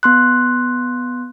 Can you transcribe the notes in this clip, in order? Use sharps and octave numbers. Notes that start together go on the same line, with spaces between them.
B3 C6 F#6